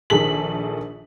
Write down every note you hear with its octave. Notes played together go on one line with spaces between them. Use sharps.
A#1 D#3 G#4 A4 B6 F#7